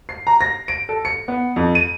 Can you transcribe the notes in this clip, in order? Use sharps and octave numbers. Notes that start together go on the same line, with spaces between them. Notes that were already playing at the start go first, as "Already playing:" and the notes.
C7
A#5
A#6
D7
A4
C#7
B3
F2
D#7